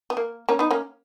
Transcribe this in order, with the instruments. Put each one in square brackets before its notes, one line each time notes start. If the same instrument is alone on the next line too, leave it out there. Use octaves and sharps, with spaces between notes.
[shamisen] B3
A#3
A#3 C#4
B3 D#4
A#3 C#4